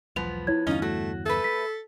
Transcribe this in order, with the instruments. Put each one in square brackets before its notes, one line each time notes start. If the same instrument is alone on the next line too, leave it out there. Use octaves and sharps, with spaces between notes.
[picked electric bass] E1 B1 [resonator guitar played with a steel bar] F3 B3 [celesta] F7
[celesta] E4 C#5 G#6
[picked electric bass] E2 G2 D3 [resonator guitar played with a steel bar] C#4 F4 [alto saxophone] D#4
[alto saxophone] A3 [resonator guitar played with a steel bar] F#4
[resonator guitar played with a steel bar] A3 B4 [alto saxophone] A4
[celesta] B6